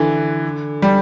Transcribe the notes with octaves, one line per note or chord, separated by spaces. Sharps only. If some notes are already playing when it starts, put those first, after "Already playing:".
Already playing: D3 E3
G3